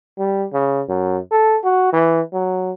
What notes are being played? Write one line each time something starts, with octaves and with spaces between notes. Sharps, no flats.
G3
C#3
F#2
A4
F#4
E3
F#3